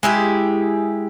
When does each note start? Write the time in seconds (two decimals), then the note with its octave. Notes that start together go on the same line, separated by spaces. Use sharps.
0.03 G#3 E4 G4 G#4